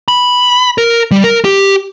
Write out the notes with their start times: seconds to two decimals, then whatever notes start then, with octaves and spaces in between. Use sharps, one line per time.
0.08 B5
0.78 A#4
1.11 G3
1.24 A#4
1.45 G4